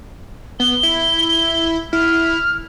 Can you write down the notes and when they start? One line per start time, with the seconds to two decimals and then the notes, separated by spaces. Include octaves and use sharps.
0.60 B3 G7
0.83 E4
1.93 E4 F6